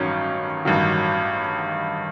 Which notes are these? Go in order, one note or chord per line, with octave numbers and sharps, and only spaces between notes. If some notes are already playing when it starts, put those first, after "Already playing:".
Already playing: A1 G2 D#3 F#3 C#4
A1 G2 D#3 F#3